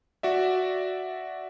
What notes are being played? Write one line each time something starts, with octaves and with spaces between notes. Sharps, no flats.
F#4 D5 E5